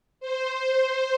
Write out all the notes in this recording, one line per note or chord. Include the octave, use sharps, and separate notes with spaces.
C5